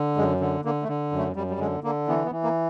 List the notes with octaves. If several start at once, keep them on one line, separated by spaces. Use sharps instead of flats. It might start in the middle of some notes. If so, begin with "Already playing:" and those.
Already playing: D3
F#2 G#3
D3
D3 A#3
A3
D3
F#2
A3
F#2 G3
G3
D3 G#3
D3 A#3
E3 B3
B3
E3
A#3